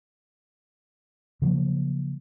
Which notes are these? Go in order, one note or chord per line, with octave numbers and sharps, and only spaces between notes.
C#3 F3 F#3 A#3